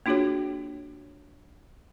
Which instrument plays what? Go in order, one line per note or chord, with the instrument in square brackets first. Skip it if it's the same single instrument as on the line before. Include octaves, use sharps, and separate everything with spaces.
[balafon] A#3 D4 F4 F#4 G#4 C#5